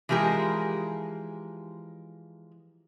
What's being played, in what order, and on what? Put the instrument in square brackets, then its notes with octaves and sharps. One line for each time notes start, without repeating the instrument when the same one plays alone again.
[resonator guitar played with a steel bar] E3 F3 G#3 G4 A#4